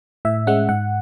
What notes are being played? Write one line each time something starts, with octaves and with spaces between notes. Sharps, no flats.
A2 E5
G#3 C#4 F#5
G#2 F#5